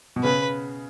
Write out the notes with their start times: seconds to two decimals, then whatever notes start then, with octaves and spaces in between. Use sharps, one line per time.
0.16 B2
0.23 C#3 B4